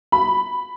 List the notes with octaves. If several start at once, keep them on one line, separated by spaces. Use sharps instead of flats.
B5